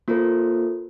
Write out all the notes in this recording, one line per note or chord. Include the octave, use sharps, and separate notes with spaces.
A#3 F4 A4 A#4 C5